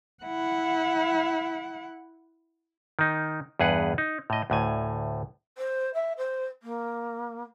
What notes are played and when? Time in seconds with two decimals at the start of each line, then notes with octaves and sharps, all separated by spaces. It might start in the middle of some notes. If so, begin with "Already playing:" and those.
0.24 E4 F#5
2.99 D#3 D#4
3.60 E2 G2 G#4 B4 F#5
3.98 D#4
4.30 A2 D#5
4.50 D2 A2 G#5
5.58 C5
5.94 E5
6.17 C5
6.63 A#3